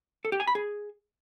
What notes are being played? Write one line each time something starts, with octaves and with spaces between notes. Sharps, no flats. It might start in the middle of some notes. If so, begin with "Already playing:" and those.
A4
G4
G#5
B5
G#4